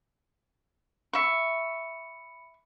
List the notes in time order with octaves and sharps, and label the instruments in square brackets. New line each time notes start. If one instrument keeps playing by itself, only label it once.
[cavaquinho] E5 C#6 [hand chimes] B5 C#7